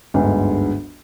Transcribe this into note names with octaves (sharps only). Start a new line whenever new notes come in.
G1 D2 G#2